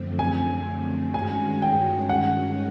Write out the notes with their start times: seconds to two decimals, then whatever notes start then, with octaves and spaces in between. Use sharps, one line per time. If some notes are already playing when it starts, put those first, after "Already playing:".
Already playing: F#2 D3 F3 A3 C4
0.19 G#5
1.14 G2 D#3 G#3 C#4 F#4 G#5
1.62 G5
2.09 F#5